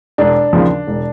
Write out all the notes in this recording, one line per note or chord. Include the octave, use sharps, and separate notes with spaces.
E1 D4
D#2 C#3 F3
E1